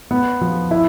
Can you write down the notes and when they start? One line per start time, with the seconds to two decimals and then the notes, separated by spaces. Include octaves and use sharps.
0.11 B3
0.41 F3
0.71 E4